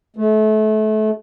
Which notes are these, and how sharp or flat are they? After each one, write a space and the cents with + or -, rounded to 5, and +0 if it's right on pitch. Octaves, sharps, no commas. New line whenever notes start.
A3 -30